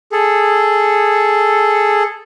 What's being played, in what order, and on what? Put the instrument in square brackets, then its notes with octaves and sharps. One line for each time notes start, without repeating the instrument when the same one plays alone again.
[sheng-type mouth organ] G#4 A4